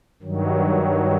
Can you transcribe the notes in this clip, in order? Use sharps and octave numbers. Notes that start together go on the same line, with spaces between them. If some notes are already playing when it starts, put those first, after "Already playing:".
G2 D#3 F#3